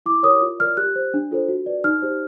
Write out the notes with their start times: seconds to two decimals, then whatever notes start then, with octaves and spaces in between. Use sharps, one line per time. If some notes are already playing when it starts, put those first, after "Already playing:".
0.06 E4 D6
0.23 G4 A#4 C#5 D#6
0.42 F4
0.59 A#4 D5 F6
0.77 G4 F#6
0.95 C5
1.14 D4
1.31 F4 A4 C5
1.48 F#4
1.66 B4 D5
1.84 D#4 F6
2.02 G4 C5